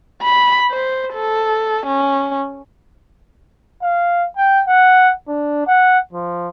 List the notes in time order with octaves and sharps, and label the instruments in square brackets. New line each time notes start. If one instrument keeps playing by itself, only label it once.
[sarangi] B5
C5
A4
C#4
[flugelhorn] F5
G5
F#5
D4
F#5
F3